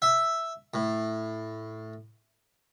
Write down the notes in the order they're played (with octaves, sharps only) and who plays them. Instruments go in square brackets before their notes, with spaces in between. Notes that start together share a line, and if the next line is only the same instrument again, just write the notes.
[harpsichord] E5
A2